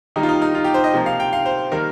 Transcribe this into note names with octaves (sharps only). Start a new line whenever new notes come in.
D#3 G3 A#3 D#4
F4
D#4
D#4
F4
G4
C5
D#5
C3 F3 A#3
F5
G5
F5
C5
D#3 G3 A#3 A#4